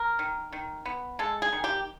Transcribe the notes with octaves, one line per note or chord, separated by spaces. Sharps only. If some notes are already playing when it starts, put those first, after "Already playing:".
Already playing: A#4
D#3
D#3
B3
G#3 A4
G#4
D#3
G4